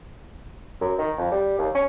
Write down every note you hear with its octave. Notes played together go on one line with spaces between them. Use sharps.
F#2
D#3
F2
G3
D#2
C#4